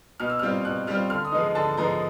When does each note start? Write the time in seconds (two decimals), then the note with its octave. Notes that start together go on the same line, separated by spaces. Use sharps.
0.20 B2 F6
0.30 E6
0.39 G3 C4 F4 F6
0.65 B2 F#6
0.87 G3 C4 F4 F6
1.10 D3 F6
1.25 D#6
1.32 F3 G#3 B3 D#4
1.55 D3 A5
1.77 F3 G#3 B3 D#4 A#5